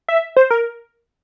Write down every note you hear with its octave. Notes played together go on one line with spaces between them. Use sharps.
E5
C5
A#4